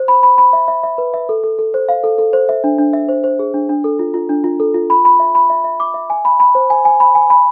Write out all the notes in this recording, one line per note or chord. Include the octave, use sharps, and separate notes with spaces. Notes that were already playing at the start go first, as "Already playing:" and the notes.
Already playing: C5
B5
B5
B5
E5
E5
E5
B4
E5
A4
A4
A4
C5
F5
A4
A4
C5
E5
D4
D4
E5
C5
C5
G#4
D4
D4
A4
F4
F4
D4
F4
A4
F4
B5
B5
E5
B5
E5
E5
D6
E5
G#5
B5
B5
C5
G#5
G#5
B5
G#5
B5